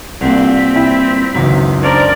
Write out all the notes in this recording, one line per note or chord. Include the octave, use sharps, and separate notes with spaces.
C2 G2 A#2 C4 F#5 B6
E4 G5
G#1 C#2 F#2 B2
D4 A#4 C5 D5 A#5